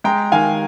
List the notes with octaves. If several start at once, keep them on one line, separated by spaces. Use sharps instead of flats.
G#3 G5 A#5
D#3 F5 G#5